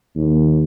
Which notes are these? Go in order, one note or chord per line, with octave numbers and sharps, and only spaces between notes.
D#2